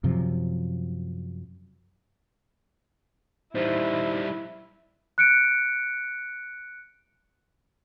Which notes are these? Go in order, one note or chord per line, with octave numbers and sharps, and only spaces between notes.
F#2 C3 F3
G3 D#4 E4 C5
F#6 C#7 D7